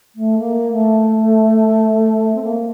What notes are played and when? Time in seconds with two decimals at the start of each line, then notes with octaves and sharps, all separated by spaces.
0.15 A3
0.38 A#3
0.72 A3
2.34 C4
2.42 A#3